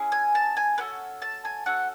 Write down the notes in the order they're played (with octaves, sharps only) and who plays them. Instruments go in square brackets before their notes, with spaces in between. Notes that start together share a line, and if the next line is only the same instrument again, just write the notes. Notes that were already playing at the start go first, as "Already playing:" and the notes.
Already playing: [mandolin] C#4 E4 G#4
G#5
A5
G#5
C#4 F#4 A4 B4
A5
G#5
C#4 F#4 A4 F#5